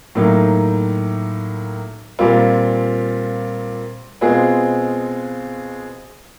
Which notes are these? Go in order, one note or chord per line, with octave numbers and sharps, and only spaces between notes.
A2 F#3 A#3 D#4
A#2 G3 C4 F4
B2 G#3 C4 F4 G#4